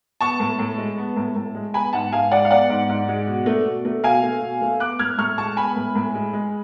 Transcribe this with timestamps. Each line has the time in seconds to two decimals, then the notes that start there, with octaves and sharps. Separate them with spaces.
0.21 B3 A5 C#6
0.40 A2
0.59 A2
0.78 G#3
0.97 B3
1.16 A2
1.36 A2
1.55 G#3
1.74 B3 G#5 B5
1.93 G#2 F#5 A5
2.12 G#2 F5 G#5
2.31 G#3 D5 F#5
2.45 F5
2.51 B3 D5 F#5
2.70 G#2
2.89 G#2
3.08 G#3
3.27 B2
3.46 A3
3.65 B2
3.85 A3
4.04 B2 F5 G#5
4.23 A3
4.42 B2
4.61 A3
4.80 B3 D6 F#6
4.99 A2 F6 G#6
5.18 A2 C#6 F6
5.38 G#3 A5 C#6
5.57 B3 G#5 B5
5.76 A2
5.95 A2
6.15 G#3
6.33 G#3